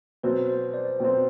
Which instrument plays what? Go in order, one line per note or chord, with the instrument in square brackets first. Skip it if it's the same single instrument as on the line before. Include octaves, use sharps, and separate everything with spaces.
[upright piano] B2 F#3 C4 [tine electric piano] B4
[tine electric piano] C5
C5
D5
[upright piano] B2 F#3 C4 [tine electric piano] G5